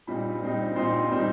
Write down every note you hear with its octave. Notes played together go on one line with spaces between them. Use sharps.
A#2 G3 C4 D#4 B5
A#2 G3 C4 D#4
A#2 G3 C4 D#4 C6
A#2 G3 C4 D#4